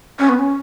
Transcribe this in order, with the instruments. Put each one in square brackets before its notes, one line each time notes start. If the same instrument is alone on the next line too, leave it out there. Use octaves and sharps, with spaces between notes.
[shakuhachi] C#4
B3
C#4